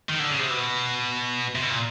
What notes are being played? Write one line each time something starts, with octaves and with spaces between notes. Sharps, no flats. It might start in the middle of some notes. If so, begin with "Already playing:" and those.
D#3
D3
C#3
C3
B2
C3
B2
A#2